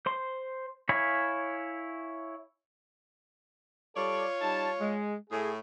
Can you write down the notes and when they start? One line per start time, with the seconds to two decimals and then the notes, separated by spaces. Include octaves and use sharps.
0.06 C5 C6
0.89 E4 C#5 F5 G#5 B5
3.96 G3 F4 A4 C#5 D5
4.42 G3 D#4 A5
4.80 G#3
5.30 A2 G#4